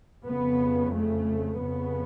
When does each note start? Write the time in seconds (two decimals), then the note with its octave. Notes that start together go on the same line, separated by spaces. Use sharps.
0.25 F2 C#3 B3
0.94 A3
1.61 F2 C#3 B3